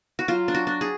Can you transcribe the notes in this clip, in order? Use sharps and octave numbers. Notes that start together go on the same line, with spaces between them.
F#4
F#3 F4
D4
F#4
D4
G#4